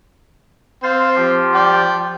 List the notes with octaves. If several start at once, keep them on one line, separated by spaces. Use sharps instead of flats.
C4 C5 F5 A6
F3 F4 G4
D5 G5